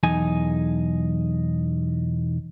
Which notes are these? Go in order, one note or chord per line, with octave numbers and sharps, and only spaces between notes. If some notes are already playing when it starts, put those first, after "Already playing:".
B1 E2 D#4 G#5